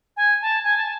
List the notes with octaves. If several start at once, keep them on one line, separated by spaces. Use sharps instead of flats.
G#5
A5
G#5
A5